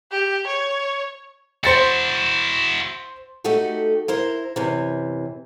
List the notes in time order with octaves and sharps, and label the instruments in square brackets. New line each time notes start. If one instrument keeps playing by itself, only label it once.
[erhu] G4
C#5
[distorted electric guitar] E4 F#4 [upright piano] C5 A6 C#7
[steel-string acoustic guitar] A3 D#4 F#4 G4 A4
E4 A#4 C5
F#2 C3 E3